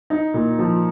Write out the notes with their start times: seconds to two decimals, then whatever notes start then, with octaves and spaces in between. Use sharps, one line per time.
0.10 D#4
0.34 A#2
0.59 F3